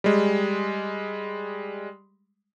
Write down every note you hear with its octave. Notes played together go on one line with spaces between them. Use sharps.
G3 G#3